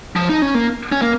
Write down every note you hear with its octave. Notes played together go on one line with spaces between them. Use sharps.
F3
D#4
C#4
A#3
C#4
A#3